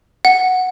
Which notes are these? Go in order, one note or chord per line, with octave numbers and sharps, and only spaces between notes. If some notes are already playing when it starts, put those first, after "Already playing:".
F#5